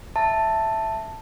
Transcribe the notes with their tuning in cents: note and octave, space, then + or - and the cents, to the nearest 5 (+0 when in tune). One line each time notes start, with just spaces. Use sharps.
E5 +0 A5 +5